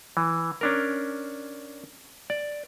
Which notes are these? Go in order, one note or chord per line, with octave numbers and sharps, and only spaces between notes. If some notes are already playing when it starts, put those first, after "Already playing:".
E3
C#4 D4 A#4
D5